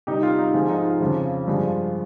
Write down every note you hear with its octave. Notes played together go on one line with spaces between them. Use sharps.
C3 G3 D#4 G4
F4
D#4
G#2 F3 G#3 F4
D#4
F4
F2 C#3 F3
G2 F3 G#3